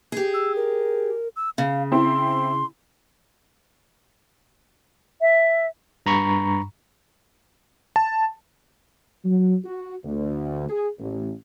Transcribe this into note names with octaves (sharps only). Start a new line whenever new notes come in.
G4 G#4
E6
A#4
E6
C#3 F5
C4 E4 C6
E5
G2 A#5 B5 C#6
A5
F#3
F#4
D2
G#4
A1